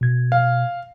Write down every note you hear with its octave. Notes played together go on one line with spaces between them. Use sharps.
B2 G#6
F5